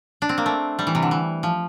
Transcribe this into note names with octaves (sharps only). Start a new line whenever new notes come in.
D4
C4
A#3
A3
G3
E3
C3
D3
E3
F3